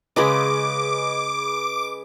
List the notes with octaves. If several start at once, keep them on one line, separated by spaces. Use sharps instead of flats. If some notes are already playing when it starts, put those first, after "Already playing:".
C#3 G#3 C#4 G#4 B4 D#5 D6